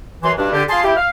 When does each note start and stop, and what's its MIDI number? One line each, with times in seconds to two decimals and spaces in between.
0.23 0.32 42
0.23 0.32 52
0.23 0.32 84
0.38 0.52 43
0.38 0.52 47
0.38 0.52 62
0.53 0.63 50
0.53 0.63 67
0.69 0.80 65
0.69 0.80 68
0.69 0.80 81
0.69 0.80 84
0.84 0.96 64
0.84 0.96 67
0.84 0.96 79
0.96 1.10 77